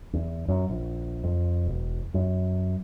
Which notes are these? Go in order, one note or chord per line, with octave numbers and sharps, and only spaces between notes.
E2
F#2
A#1
F2
E1
F#2